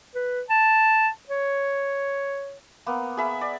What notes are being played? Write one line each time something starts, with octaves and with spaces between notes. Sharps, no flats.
B4
A5
C#5
A#3 B3
G#4 E5 B5
D5